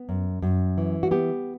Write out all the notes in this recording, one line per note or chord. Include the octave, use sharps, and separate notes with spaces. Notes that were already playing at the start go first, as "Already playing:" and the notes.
Already playing: B3
F#2
F#2
E3
F#4
B3 G4